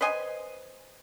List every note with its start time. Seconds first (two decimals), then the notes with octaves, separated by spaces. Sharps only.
0.01 B4 C5 D#5 G#5